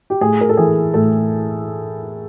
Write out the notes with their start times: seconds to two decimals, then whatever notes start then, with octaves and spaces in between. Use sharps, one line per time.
0.10 G4
0.21 A2 G#4
0.41 A#4
0.49 A4
0.57 E3 G#4
0.94 A2 A4